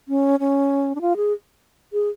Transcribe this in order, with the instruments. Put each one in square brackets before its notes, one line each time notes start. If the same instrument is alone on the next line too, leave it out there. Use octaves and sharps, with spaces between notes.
[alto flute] C#4
C#4
D4
F4
G#4
G#4